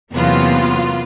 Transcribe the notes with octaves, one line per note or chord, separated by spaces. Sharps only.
E2 C3 F#3 A#3 B3 F4